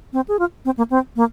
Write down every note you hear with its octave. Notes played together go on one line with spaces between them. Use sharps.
C4
G#4
F4
C4
A#3
C4
A#3